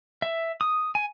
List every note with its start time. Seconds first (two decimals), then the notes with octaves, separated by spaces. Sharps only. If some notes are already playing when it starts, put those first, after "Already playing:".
0.22 E5
0.61 D#6
0.95 G#5